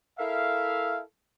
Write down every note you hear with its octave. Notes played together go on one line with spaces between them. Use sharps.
E4 A4 A#4 E5 F5